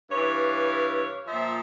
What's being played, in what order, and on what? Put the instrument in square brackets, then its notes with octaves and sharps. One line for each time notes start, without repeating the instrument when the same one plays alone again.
[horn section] G2 E3 C#5 F5
A#2 F3 C5 E5